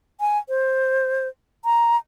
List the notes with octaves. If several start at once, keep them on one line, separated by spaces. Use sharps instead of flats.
G#5
C5
A#5